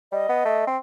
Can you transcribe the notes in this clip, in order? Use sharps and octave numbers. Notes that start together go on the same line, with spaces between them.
G3 D#5
B3
A3
C4